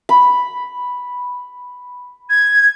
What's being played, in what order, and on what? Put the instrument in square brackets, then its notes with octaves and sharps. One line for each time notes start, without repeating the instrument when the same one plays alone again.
[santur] B5
[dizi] G#6